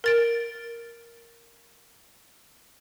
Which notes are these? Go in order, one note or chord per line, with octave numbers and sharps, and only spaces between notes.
A#4 A6 D7